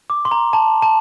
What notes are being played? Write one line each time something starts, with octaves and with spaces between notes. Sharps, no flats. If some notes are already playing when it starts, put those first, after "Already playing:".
D6
C6
A#5
A5
A5